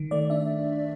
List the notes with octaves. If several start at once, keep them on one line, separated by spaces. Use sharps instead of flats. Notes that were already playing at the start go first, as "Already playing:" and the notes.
Already playing: D#3
A3 D5
D4 E5